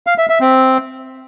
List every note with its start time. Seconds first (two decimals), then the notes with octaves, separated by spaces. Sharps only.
0.07 F5
0.18 E5
0.29 E5
0.41 C4